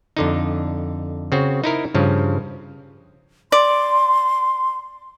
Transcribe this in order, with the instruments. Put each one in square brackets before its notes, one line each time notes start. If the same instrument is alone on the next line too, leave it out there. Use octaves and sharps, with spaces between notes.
[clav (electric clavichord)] F2 D3 D#4
C#3 C4 F#4
D#4 E4 A#4
G2 C#3 F3
[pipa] D5 [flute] C6